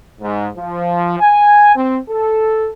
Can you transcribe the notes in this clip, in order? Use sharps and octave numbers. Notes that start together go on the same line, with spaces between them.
G#2
F3
G#5
C4
A4